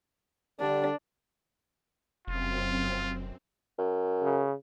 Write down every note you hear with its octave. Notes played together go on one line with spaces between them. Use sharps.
D3 G3 D4
F1 F#2 C4 F4
F#2
C#3